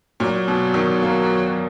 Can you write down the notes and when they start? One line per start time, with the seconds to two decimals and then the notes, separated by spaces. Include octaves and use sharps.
0.20 A#2 F#3
0.48 B2
0.74 D#3
1.02 A#3